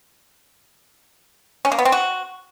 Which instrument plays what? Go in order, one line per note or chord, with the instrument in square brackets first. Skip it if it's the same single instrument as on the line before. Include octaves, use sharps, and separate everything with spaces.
[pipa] C#4
A#3
B3
C4
F#4